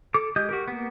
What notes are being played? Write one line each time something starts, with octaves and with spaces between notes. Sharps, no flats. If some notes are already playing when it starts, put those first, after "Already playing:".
A4 D6
G#3 G4 D#5 D#6 G6
F#4 G4 A#4
A#3 B3